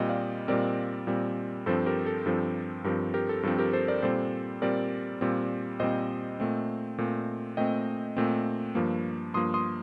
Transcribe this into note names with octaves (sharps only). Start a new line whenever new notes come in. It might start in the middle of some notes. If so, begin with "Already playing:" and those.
Already playing: A#2 G3 C4 D#5 G5
D5 F5
A#2 G3 C4 A#4 D5
A#2 G3 C4
G2 F3 C4 A4 C5
G4 A#4
A4
G2 F3 C4 A4
G2 F3 C4 G4 A#4
G4 A#4
A4
G2 F3 C4 A4
G4 A#4
A4 C5
A#4 D5
A#2 G3 C4 A4 C5
A#2 G3 C4 A#4 D5
A#2 G3 C4
A#2 G3 C4 C5 D#5
A#2 A3 C4
A#2 A3 C4
A#2 A3 C4 D#5 G5
A#2 A3 C4
G2 F3 A#3
G2 F3 A#3 C6 D#6
C6 D#6